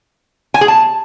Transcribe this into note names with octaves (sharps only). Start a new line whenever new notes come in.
G#5
G#4
A5